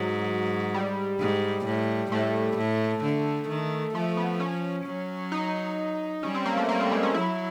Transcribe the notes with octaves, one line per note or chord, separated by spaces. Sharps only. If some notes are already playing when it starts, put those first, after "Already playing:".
Already playing: G#2 F#3
G3
G#2
A2
A2 A3
A2
D3
D#3
F3 A3
B3
C#4
F#3
D#4
G3 C#4
C4
A#3
A3
G3 A#3
C4
G#3
C#4
F#3 E4